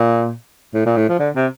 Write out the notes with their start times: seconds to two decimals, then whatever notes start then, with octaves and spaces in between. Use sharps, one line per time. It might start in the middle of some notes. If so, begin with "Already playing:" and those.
Already playing: A#2
0.74 A2
0.86 A#2
0.97 A2
1.09 F3
1.19 D3
1.36 C3